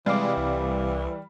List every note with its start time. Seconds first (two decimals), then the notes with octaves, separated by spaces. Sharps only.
0.06 C3 E3 G3 G#3 F5 D6
0.37 C2